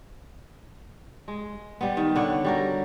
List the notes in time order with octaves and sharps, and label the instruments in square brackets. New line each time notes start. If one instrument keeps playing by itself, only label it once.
[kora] G#3
G3 B3
D#3
D3 C#5 F#5
G3 F#4 A#4